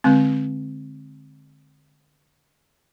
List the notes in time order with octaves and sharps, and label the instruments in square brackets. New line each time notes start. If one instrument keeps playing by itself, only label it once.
[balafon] D3 G#3 C4